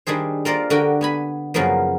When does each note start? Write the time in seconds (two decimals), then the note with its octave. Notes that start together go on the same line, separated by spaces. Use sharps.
0.07 D#3 G3 D4 G#4 C5
0.45 A#3 F4 A#4 C5 D5
0.70 D3 F#4 G4 A#4 G5
1.01 B3 G#5 B5
1.54 F#2 C#3 F3 F#3 A#3 B3